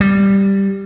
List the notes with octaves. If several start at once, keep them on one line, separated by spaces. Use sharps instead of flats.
G3